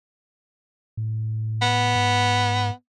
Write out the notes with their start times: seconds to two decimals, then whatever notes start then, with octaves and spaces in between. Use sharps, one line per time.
0.97 A2
1.62 B3
1.96 G#2